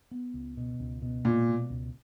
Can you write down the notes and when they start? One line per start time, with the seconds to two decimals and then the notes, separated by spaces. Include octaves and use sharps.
0.11 B3
0.34 C#2
0.57 B2
0.80 C#2
1.02 B2
1.25 A#2 G#3
1.49 B2
1.70 C#2